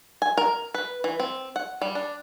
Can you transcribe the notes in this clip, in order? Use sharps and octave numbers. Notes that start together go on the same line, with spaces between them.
G#5
A#4
B4
E3
C4
F#5
G3
D4